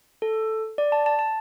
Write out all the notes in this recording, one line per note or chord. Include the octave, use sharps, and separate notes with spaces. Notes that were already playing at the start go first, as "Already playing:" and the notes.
A4
D5
A5
A5
A5